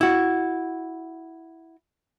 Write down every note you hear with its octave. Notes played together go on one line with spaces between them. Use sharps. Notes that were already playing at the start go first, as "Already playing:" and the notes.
E4 F#4